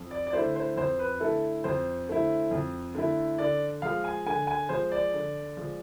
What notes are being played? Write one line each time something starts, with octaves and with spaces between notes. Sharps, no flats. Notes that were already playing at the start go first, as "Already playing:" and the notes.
Already playing: F2
D5
D5
D3 A3 E4 C5
C5
F2 C5
B4
D3 A3 E4 A4
F2 C5
D3 A3 E4
F2
D3 A3 E4
D3 D5
F3 G#3 F5
G#5
D3 G#5
G#5
F3 G#3 C5
D5
D3
F3 G#3